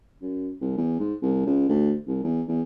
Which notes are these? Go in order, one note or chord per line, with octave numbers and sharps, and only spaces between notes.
F#2
C2
E2
G#2
C2
C#2
D2
C2
E2
E2